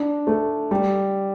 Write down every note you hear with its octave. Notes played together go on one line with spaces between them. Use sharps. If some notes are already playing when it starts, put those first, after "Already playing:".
Already playing: D4
A3
G3